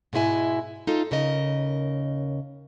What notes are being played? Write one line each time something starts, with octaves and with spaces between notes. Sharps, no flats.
G#2 B2 G#3 E4 G#5
D#4 F4 A4
D#2 C#3 A#4 D#5